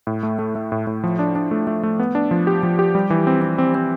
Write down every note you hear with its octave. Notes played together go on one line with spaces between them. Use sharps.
A2
A3
A3
A3
A2
A2
F3
D4
D4
A3
A3
A3
B3
D4
F3
G4
F3
G4
G3
E3
C4
C4
C4
C4